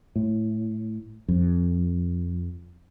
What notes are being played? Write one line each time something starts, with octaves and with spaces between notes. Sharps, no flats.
A2
F2